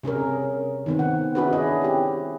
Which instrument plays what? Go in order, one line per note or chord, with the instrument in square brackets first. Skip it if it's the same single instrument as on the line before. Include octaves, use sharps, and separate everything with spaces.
[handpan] C3 C#4 G#4 A#4
D#3 B3 C4
F#5
C#4 D4 E4 F#4 G#4 B4
E4 G#4 D#5
C4 G4